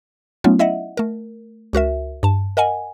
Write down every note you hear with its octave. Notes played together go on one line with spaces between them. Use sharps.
F#3 A3 B3 C#4 D#4 F4
E4 D#5 E5 F#5
A3 A#4
C#2 F#4 A#4 E5
G2 A5
A#4 D#5 F#5 G#5